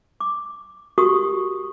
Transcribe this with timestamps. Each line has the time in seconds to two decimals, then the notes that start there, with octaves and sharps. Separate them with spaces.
0.20 D6
0.98 F#4 G4 A#4 C#6 D#6